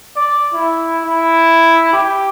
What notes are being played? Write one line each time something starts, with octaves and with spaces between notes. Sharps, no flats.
D5
E4
E4
G4